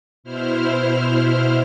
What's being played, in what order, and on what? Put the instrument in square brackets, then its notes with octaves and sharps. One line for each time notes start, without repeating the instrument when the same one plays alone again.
[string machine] B2 E4 C5 F6